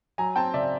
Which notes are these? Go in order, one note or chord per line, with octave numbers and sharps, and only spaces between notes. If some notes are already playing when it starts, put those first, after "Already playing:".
F#3 G#5 A#5
C4 G5 A5
C#3 D5 E5